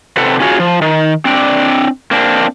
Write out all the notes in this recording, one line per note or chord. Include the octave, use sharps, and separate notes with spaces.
C3 C4 A4 B4 F#5
C#4 F4 F#4 G#4 C#5
F3
D#3
C4 D4 D5
A#3 C4 D4